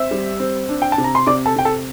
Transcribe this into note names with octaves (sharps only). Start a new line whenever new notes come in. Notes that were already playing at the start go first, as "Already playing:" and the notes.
Already playing: C4 E5 E6
G3
C4
D4
G5
A5
C3
A#5
C6
C3 D5 D6
A4 A5
C3 G5
A4 A5